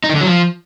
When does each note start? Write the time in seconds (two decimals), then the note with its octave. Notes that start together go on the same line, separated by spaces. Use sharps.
0.04 D#4
0.09 D#3
0.15 D3
0.21 F#3
0.27 F3